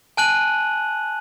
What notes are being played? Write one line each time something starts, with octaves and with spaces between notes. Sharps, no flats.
G#5 A5 F#6 D#7 F#7